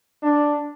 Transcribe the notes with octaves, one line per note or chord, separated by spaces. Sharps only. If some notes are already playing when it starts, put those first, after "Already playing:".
D4